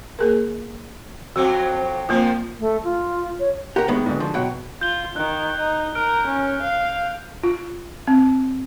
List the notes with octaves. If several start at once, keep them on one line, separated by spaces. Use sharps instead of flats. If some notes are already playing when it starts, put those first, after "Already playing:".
A#3 G#4 A#4
F2 F#3 C4 F#4
A#2 F3 A#3 C4 F4
A3
F4
C#5
G4 A#4 F#5 A#5
A2 D#3 G#3 B3
D2 G#2
F3
B2 F#3 F#5 G5
F4 G6 G7
D#3 F#6
D#4
A#4 F6 D7
C#4
F5
F4
C4